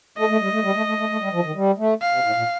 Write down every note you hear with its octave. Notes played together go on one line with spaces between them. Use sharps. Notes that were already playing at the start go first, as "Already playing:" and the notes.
A3 D#5
A3
G3
A3
G3
A3
A3
A3
A3
G3
F3
D#3
G3
A3
F5
C3
A2
A#2